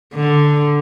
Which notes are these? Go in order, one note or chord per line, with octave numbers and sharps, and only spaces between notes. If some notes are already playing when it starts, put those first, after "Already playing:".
D3